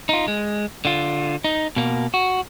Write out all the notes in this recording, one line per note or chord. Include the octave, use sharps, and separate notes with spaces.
D#4 F4
G#3
D3 F4
D#4
B2 A#3
F#4